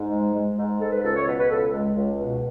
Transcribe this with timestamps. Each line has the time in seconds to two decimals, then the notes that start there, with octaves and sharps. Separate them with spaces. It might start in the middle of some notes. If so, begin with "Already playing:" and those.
Already playing: G#2
0.11 G#3
0.34 G#3
0.57 G#2
0.80 G#3 A4
0.91 B4
1.03 C#2 A4
1.15 C#5
1.26 B2 B4
1.38 B4
1.50 C#2 A4
1.73 G#3
1.96 C#2
2.19 B2